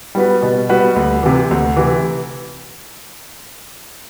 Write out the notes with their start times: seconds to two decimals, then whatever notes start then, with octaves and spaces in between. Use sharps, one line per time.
0.15 G3 B3 F#4 B4
0.42 B2
0.69 G3 B3 F#4 B4
0.96 D2
1.23 C3 E3
1.51 D2
1.76 C3 E3